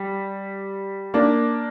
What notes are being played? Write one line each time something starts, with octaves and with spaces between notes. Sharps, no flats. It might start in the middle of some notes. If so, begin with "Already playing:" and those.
Already playing: G3
A#3 D4